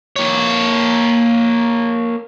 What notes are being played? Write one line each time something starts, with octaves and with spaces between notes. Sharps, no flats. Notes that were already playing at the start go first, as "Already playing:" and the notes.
A#3 C#5